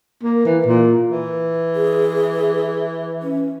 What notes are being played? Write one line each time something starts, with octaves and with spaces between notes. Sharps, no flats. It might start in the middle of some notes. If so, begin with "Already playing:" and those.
A#3
E3
A#2
E3
G#4
C#4